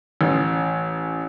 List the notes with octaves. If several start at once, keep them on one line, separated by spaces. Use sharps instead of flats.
A1